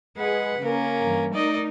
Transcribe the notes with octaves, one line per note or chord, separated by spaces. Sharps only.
G#3 G#4 B4 F#5
C#3 A#3 C#4 A#4
G2 E3
A3 D#4 A#4 D5 D#5